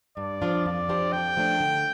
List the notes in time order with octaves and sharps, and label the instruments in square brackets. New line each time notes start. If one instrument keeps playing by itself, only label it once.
[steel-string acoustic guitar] G2 [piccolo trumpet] D5
[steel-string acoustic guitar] F3 D4 F4
[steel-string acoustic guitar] F2 [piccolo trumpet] D5
[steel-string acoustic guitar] F3 D4 G4 C5
[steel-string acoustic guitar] F2 [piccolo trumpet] G5
[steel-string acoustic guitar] F3 A3 D4
D3